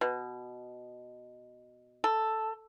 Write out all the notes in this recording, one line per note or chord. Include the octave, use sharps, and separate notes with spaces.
B2
A4